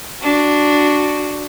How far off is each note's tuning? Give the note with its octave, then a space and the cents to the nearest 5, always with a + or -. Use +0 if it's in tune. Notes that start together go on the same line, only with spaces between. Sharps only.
D4 +0 F#4 +0